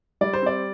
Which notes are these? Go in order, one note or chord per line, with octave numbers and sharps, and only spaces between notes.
G3 D5
C5
C4 D5